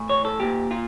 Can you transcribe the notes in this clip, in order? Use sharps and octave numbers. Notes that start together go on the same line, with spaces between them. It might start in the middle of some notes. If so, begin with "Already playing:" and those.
Already playing: A2 E3
C#5
A4
A#2 G4
F4